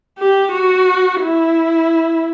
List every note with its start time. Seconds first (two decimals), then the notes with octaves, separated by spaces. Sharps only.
0.18 G4
0.52 F#4
1.22 E4